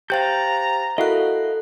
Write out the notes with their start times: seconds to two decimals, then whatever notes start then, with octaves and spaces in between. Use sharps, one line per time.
0.10 G4 C5 F5 G5 A#5 G6 A6
0.98 E4 F#4 A4 A#4 D#5 F5 F#6